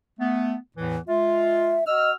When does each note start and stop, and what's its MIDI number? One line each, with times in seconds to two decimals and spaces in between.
0.20 0.56 57
0.20 0.56 59
0.77 0.98 40
0.77 0.98 45
0.77 0.98 52
1.08 1.80 56
1.08 1.80 65
1.08 1.84 76
1.87 2.13 66
1.87 2.10 75
1.87 2.13 88
1.87 2.13 89